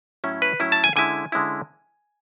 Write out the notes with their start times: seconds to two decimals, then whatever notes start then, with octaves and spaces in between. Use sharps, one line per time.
0.24 A2 F#3 C#4 E4
0.42 B4
0.60 A2 F#3 C#4 E4
0.72 A5
0.84 G#5
0.96 D3 G#3 C#4 E4 G#5
1.32 D3 G#3 C#4 E4